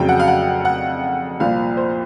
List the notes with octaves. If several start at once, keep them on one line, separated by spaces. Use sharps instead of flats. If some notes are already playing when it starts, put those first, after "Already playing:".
Already playing: F2 C#3 F#3 G5
F#5
F5
F#5
F#5
C2 A#2 F3 F5
C5